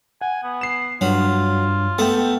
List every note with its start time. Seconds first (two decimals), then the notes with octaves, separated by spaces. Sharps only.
0.21 F#5 G#5
0.44 B3
0.61 C7 E7
1.01 G2 F#3 F4
1.99 A3 B3 A4 G5